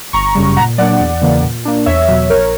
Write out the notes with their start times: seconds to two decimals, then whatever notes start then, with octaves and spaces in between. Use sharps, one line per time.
0.13 G1 A#5 C#6
0.35 F#2 C#3 G3
0.57 A#2 F#5 A#5
0.78 F#3 A#3 D4 D5 F#5
1.00 E2
1.22 C#3 E3 A#3
1.43 A#2
1.65 A#3 D4
1.86 E2 C#5 E5
2.08 B2 F#3
2.30 A#1 A#4 C#5